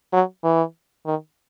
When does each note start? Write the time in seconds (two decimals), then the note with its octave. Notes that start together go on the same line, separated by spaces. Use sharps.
0.13 F#3
0.44 E3
1.05 D#3